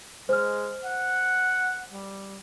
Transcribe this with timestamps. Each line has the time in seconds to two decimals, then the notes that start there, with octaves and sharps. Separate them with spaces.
0.29 G#3 C5 F6
0.85 F#5
1.92 G3